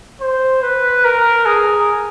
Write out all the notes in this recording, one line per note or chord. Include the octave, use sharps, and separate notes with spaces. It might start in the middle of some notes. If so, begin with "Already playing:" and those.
C5
B4
A#4
G#4